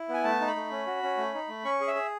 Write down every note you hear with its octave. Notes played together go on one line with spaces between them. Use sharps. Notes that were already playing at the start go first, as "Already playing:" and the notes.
Already playing: E4
B3 G#5
A3 A5
D#4
B5
A3
C#4
F#4
C#4
A3
D#4
A3
C#4 C#6
G#4
E5
G#4